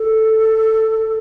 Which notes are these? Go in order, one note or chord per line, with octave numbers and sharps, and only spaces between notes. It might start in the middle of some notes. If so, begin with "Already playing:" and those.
Already playing: A4